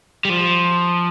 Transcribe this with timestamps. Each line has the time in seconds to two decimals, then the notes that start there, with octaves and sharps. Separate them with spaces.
0.25 G3
0.29 F3